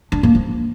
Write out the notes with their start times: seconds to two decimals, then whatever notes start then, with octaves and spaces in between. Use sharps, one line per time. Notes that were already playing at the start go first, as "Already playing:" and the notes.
0.12 D4
0.23 A#3
0.35 F3